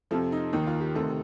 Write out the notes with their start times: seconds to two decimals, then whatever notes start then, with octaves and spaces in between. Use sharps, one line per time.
0.11 F2 C3 F3 A4
0.32 D#4
0.53 D#2 D#3
0.67 F4
0.81 G4
0.95 D2 C3 D#3 A4